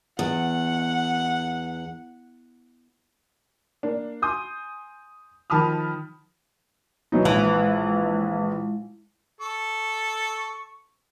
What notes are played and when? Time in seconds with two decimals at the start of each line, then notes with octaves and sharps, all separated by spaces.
0.19 E2 F#5
3.83 A#3 D4
4.22 G#5 C6 D#6 G6
5.50 D#3 F3 A5 B5 D#6 F6
7.12 E3 F#3 D#4
7.25 A#1 E3 G#3
9.41 A4 C#6